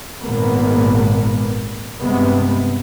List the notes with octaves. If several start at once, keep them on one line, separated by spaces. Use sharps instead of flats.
G#1 A#2 G#3 A#3 B3
G2 C3 G#3 B3